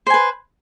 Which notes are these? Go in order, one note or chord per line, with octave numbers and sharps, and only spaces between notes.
B4 C5 G#5